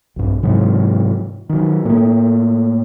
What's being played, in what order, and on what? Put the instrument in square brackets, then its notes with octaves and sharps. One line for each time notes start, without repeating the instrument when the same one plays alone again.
[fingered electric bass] B1 G2
G#2 C3 E3 F#3
D#3 F#3
A2 A3 A#3